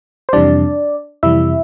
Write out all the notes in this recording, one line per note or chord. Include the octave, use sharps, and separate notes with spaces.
C5
F2 C3 E3 G3 D4 D5
F2 C3 E3 G3 E4 E5